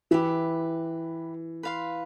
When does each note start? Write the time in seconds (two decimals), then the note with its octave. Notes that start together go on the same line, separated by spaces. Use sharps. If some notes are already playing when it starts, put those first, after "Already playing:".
0.11 E3 G4 B4 E5 B5
1.63 B4 F5 C6